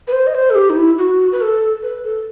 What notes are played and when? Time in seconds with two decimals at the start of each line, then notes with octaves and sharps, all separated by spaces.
0.08 B4
0.12 C5
0.27 D#5
0.35 C5
0.50 A4
0.55 G4
0.70 D#4
0.76 E4
0.98 F#4
1.32 B4
1.41 A4
1.83 B4
2.04 A4